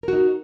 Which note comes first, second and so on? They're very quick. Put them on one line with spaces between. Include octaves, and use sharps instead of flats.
A#4 F#4 D#4